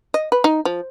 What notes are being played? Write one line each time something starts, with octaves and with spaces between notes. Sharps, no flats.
D#5
B4
D#4
F3